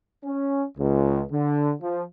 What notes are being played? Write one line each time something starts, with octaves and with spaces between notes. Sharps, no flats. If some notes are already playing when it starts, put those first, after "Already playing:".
C#4
C#2
D3
F3